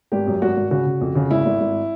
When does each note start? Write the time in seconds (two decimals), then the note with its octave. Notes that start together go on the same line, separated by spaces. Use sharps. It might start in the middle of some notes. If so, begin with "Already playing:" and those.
0.12 G#1 G4
0.27 F#2
0.42 G#1 F#4
0.56 G#1
0.71 C#3 F#4
0.86 C#3
1.01 F2
1.15 C#3
1.30 G#1 E4
1.46 G#1
1.60 G#1